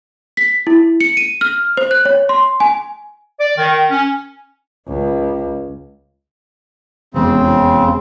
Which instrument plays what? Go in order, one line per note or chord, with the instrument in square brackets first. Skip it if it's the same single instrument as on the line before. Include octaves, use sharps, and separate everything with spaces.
[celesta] B6
E4
C#7
D#7
F6
C5
F#6
C#5
C6
G#5
[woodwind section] D5
D#3
C#4
[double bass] C#2
[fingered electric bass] F1 E2 G#3 [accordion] C#3 C4